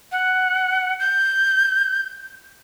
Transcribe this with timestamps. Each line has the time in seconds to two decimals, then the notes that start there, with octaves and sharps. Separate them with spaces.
0.12 F#5
1.00 G6